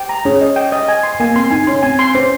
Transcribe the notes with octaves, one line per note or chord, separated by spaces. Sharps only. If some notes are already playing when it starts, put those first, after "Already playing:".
Already playing: G5
A#5
C#4 G#4
D#5
G5
D#5
G#5
C6
A#3 G#5
C4 C6
D#4 G#5
C#4 C6
C4 G#5
C6
C#4 C5